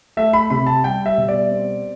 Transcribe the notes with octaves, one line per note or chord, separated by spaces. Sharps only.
A3 E5
B5
C3 B5
A5
G3 G5
E5
B2
D5
C4